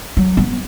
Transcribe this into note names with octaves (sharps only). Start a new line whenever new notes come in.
F#3
B3